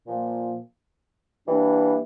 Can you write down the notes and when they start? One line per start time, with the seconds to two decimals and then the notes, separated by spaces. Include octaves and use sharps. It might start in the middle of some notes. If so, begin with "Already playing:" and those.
0.06 A#2 F3 A#3
1.47 E3 G3 A#3 D4